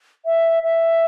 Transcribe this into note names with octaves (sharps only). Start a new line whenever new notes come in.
E5
E5